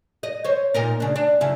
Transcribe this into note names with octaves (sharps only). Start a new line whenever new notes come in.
D#5
C5 C#5
A#2 D#4 A#4
C#3 D4
D4
F#2 C#3 E4